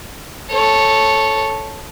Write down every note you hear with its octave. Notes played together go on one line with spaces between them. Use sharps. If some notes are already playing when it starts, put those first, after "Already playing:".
A4 C#5